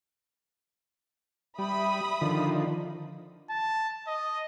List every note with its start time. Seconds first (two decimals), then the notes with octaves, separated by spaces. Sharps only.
1.59 G3 E5 B5 D#6
2.22 D3 D#3 F3
3.50 A5
4.07 D#5